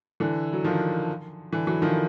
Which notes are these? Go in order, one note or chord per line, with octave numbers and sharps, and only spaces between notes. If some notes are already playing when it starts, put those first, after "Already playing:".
D3 E3
F#3
D#3 F3
D3 E3
E3 F#3
D#3 F3